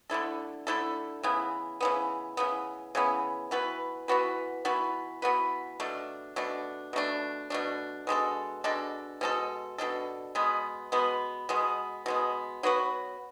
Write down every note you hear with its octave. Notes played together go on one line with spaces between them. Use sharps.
D3 A3 E4 A4
D3 A3 E4 A4
C#3 E3 B3
C#3 E3 B3
C#3 E3 B3
C#3 E3 B3
E3 B3 F#4 B4
E3 B3 F#4 B4
E3 B3 F#4 B4
E3 B3 F#4 B4
B2 A3 D4
B2 A3 D4
B2 A3 D4
B2 A3 D4
B2 G#3 D4 A4
B2 G#3 D4 A4
B2 G#3 D4 A4
B2 G#3 D4 A4
B2 G#3 B3
B2 G#3 B3
B2 G#3 B3
B2 G#3 B3
F#3 B3 F#4 B4